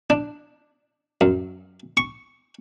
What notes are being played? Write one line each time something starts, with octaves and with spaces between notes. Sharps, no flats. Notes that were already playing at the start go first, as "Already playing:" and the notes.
D4
F#2
C#6